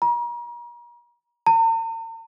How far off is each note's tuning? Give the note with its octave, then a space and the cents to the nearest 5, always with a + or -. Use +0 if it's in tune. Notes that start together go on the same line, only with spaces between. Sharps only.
A#5 +40
A#5 -45